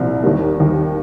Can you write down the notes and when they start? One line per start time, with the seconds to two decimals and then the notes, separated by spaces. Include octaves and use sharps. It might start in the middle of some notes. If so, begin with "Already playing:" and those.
Already playing: C2 A#2 F3
0.24 D#2 D#3 G3 A#3
0.59 D#2 D#3 G3